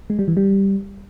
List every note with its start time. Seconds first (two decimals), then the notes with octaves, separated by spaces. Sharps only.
0.10 G#3
0.19 G3
0.28 E3
0.37 G3